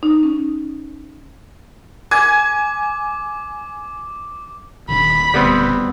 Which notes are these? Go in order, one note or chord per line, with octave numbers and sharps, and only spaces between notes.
D#4
C#4
G#5 D6 G#6
D#1 D#3 D4 B5
D#1 D2 G3 B3 C4